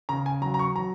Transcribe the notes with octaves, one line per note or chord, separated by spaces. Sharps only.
C#3 A#5
G#5
F#3 A#5
A#5
C#6
F#3 A#5